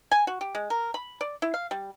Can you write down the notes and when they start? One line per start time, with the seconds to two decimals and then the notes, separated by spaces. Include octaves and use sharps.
0.11 G#5
0.27 F#4
0.41 G4
0.55 G#3
0.70 A#4
0.94 B5
1.21 D5
1.42 E4
1.54 F5
1.71 G3